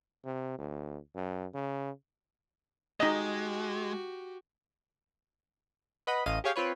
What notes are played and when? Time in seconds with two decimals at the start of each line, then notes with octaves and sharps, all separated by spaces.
0.24 C3
0.58 D2
1.15 F#2
1.54 C#3
3.00 G#3 D#4 F#4 G4 D#5
6.07 B4 D#5 F#5 B5
6.26 A1 D#5 F5 D#7
6.44 G4 G#4 C#5 F5 G5
6.56 C4 F4 B4 C#5